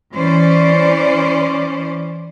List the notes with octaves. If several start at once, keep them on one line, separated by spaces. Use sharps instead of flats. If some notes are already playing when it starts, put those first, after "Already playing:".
E3 C#4 C5 D5